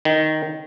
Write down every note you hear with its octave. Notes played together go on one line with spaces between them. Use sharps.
D#3